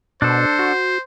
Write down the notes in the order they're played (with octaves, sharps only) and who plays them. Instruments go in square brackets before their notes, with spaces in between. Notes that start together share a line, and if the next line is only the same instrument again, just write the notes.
[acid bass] B2 [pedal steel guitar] D4 A4 [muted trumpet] C5
[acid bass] F#4